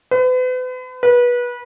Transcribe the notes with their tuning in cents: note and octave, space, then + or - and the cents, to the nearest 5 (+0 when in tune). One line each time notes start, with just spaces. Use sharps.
B4 +40
B4 -25